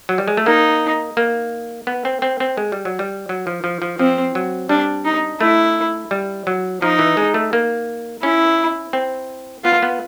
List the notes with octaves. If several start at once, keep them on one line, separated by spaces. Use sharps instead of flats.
F#3
G3
G#3
A3
A#3 D#4
A#3
B3
C4
C4
C4
G#3
G3
F#3
G3
F#3
F3
F3
F3
F3 C4
F#3
G3 D4
D#4
A3 E4
G3
F#3
F3 D#4
E3
G#3
A3
A#3
C#4 E4
C4
B3 F4
B3